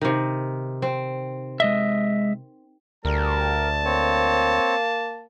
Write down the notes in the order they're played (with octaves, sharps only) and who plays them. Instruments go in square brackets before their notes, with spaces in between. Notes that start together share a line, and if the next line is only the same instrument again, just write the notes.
[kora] C3 D#3
C4
[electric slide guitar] G#3 D#5 E5
[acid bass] D2 [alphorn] G3 [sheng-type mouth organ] A#4 [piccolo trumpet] A5
[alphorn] A#3 [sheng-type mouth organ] C4 C#5